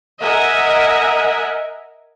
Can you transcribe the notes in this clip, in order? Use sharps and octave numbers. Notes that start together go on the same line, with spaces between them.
A#4 D#5 E5 F#5 G#5